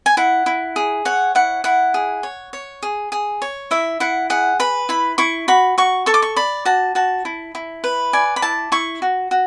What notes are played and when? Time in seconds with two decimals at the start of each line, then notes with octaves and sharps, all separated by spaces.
0.06 G#5
0.17 E4 F#5
0.46 E4
0.76 G#4
1.05 C#5 F#5
1.35 E4 F#5
1.64 E4 F#5
1.94 G#4
2.23 C#5
2.53 C#5
2.83 G#4
3.12 G#4
3.42 C#5
3.71 E4 E5
4.00 E4 F#5
4.30 G#4 F#5
4.60 B4 B5
4.89 E4 B5
5.18 E4 C#6
5.48 F#4 B5
5.78 F#4 C#6
6.06 A4 C#6
6.14 D6
6.22 C#6
6.36 D5 B5
6.65 F#4 A5
6.95 F#4 A5
7.25 E4
7.55 E4
7.84 B4
8.13 D5 G#5
8.36 B5
8.42 E4 A5
8.72 E4 C#6
9.02 F#4
9.31 F#4